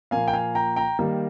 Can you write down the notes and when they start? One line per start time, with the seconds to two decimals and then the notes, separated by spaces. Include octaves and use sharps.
0.11 A#2 F3 A#3 F5 G#5
0.28 G5
0.33 F5 G#5
0.55 G5 A#5
0.76 G5 A#5
0.99 D#3 G3 A#3